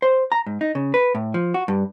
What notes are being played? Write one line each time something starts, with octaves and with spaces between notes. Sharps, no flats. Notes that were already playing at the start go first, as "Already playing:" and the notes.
C5
A#5
G#2
D#4
C#3
B4
A2
F3
F#4
G2